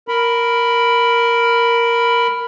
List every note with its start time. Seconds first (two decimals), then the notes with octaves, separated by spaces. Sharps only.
0.08 A#4 B5